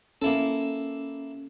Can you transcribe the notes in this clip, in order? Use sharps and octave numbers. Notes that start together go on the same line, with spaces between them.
A#3 C#4 E4 A4